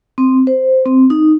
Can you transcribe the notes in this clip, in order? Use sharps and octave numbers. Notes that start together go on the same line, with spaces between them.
C4
C5
C4
D#4